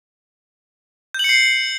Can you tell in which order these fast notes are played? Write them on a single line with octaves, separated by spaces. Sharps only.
G6 F#7 C#7 C7